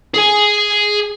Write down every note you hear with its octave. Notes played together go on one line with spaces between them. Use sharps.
G#4 G#5